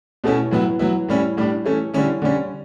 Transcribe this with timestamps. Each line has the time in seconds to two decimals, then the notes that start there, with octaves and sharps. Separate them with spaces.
0.24 B2 A3 C#4 E4
0.51 A2 F#3 B3 E4
0.79 F#3 B3 E4
1.09 A2 G3 C#4 E4
1.37 A2 G3 D4
1.65 E3 A3 C#4
1.94 D3 G3 C#4 E4
2.22 D3 G3 C#4